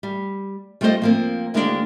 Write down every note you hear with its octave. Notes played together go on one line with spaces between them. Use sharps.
G3
G3 A3 F4 A4 C5 D#5
F3 A#3 C4
D2 D#3 G#3 A#3 B3 D4